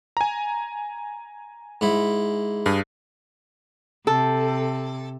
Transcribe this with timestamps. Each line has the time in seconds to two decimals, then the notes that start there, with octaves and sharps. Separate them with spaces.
0.17 G#5 A#5
1.81 G#2 E4
2.66 G2 G#4
4.07 C3 A4